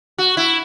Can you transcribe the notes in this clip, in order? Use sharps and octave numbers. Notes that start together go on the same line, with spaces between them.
F#4
E4